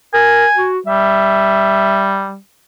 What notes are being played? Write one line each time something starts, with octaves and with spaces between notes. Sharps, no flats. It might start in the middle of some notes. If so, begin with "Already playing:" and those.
A#4 G#5
F#4
G3 E5